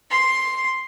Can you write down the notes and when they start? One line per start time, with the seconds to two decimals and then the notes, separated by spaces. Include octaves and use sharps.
0.10 C6